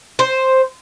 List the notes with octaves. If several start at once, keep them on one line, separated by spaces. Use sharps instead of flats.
C5